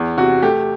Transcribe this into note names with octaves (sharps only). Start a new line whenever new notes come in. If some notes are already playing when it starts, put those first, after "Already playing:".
Already playing: E2
C3 F#4
A3 G4